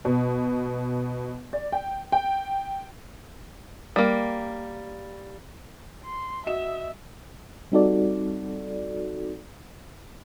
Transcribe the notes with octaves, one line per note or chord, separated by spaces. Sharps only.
B2
D5
G5
G5
G3 A#3
C6
F#4 D#5 E5 E7
G3 C4 D#4 F#4 A4 D5